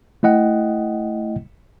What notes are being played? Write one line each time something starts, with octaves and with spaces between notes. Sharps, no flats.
A3 E4 D#5 F#5 G5